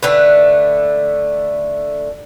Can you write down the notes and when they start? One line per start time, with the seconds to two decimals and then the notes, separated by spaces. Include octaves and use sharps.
0.03 D3 A3 B4